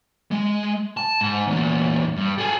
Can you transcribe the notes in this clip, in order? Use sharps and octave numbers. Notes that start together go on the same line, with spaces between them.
G#3
A5
G#2
E2 A#2
G2
G#4 A4